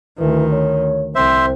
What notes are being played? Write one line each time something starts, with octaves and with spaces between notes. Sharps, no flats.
D2 D#3 E3
C#5
C2 C4 C5 E5